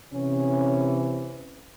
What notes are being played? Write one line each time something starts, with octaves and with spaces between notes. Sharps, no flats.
C3 E3 C#4